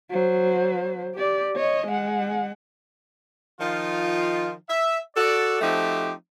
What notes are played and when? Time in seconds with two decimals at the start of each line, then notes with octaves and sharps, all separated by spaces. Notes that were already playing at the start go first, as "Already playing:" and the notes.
0.11 F#3 C5
1.15 G4 D5
1.56 C#5 D#5
1.87 G#3 F#5
3.60 D#3 F3 D#4 F4
4.69 E5
5.16 F#4 A4 D5
5.61 F3 A3 C4 D#4 F#4 G4